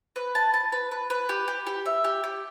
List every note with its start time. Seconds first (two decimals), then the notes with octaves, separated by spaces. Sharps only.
0.16 B4
0.35 A5
0.54 A5
0.72 B4
0.91 B4
1.10 B4
1.29 G4
1.48 G4
1.67 G4
1.86 E5
2.04 G4
2.24 G4